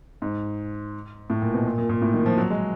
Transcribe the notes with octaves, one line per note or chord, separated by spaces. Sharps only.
G#2
A2
A#2
B2
A#2
A#2
A#2
A2
D#3
F3
F#3
G#3